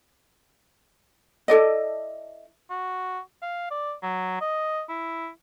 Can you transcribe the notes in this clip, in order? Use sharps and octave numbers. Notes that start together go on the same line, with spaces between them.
E4 A4 D5 D#5
F#4
F5
D5
F#3
D#5
E4